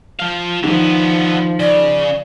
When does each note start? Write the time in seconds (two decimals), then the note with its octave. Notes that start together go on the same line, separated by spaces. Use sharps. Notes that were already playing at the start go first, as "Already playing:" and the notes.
0.20 F3 F5
0.64 D3 D#3 F3 B3
1.60 C#3 D5